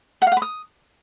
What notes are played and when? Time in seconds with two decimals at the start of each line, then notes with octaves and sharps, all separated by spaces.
0.22 F#5
0.27 F5
0.32 F#5
0.37 B5
0.42 D#6